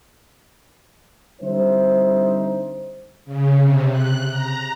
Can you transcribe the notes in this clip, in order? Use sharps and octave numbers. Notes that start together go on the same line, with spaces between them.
D3 G3 C4 D#4 E4 C5
C#3
C3
F#6
A#5